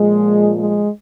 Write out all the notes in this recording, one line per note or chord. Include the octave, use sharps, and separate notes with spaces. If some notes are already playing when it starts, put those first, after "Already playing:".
Already playing: A#2 F3 G#3
G#3